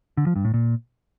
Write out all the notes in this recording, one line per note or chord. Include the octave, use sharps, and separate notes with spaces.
D3
F3
G2
A2
A#2